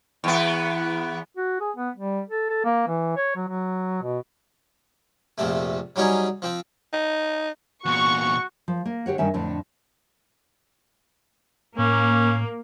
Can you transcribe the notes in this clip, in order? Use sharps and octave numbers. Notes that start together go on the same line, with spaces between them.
E2 B3
F#4
G#4
B3
G3
A4
A4
A#3
E3
C#5
F#3
F#3
B2
A#1 F2 C3 A3
F#3 G3 C#4 D#4 G#4
F3 C4
D#4
E2 A#2 F#4 C#6
F3
A#3
D3 G4 C#5 F#5
G2 D3 D#3 C#4 E5
F2 A2 D3 D4
A2 A#3 C#4